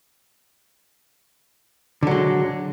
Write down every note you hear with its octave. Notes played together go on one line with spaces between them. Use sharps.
D3 F#3 G#3